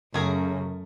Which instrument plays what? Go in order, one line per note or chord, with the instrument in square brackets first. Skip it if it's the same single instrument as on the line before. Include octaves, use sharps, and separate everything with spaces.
[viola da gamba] F#2 [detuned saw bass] C#3 [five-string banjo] A3 G#4 A#4